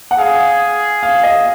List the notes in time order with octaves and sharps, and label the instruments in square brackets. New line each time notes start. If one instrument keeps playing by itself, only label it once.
[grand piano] F#5
[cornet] G#4 [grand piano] F5
[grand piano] F5
D#5